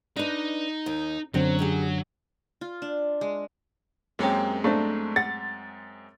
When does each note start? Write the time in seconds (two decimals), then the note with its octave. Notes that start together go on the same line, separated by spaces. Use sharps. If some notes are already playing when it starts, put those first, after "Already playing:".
0.16 D4 D#4 B4
0.86 D#2
1.34 F#2 D3 F#3 C4
1.59 C#4 G4 G#4
2.61 F4
2.82 D4
3.21 G#3
4.19 F#2 G#3 A#3 C4 C#4 G4
4.64 A3 A#3 D4 C5
5.16 F#5 A6